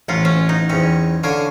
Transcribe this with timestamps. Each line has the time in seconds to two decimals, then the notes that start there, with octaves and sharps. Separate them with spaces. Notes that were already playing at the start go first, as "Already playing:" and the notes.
0.09 A1 F#3 C#4 F4
0.25 C#4
0.49 D#4
0.70 E2 C4 C#4
1.23 D3 C#5 F5 G#5